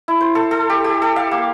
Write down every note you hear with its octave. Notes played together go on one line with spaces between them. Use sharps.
E4
C5
A4
A4
G4
G4
A4
F5
A#3